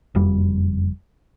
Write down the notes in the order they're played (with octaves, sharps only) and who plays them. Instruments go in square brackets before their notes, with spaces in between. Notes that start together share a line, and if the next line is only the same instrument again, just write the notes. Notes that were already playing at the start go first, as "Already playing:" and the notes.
[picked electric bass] F#1 F2 G3